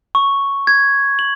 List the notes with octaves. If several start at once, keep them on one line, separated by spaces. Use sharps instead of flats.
C#6
G#6
F#7